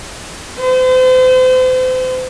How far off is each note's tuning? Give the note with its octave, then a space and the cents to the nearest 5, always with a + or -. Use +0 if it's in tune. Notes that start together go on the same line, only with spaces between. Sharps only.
C5 -35